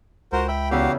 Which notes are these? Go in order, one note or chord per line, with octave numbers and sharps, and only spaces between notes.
C#2 F#4 A#4 C5
E5 G5 B5
E2 C#3 F#4 G4 E5 F5